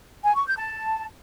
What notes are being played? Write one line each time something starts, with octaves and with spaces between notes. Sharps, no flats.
G#5
C#6
G6
A5